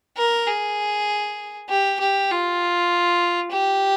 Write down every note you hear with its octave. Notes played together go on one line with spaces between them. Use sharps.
A#4
G#4
G4
G4
F4
G4